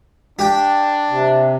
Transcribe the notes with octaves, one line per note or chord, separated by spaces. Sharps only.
D4 G4 G5
C3